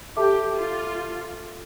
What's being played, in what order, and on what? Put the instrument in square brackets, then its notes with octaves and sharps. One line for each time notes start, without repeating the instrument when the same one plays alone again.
[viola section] G4 [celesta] A4 E5 A5 D6
[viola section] F4